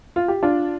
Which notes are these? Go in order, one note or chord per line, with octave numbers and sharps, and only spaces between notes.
F4
G4
D4 F4